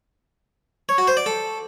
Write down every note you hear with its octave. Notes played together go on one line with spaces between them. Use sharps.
C#5
F#4
C5
D5
A4